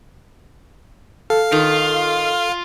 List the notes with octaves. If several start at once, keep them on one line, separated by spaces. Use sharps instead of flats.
A4 F5
D#3 F4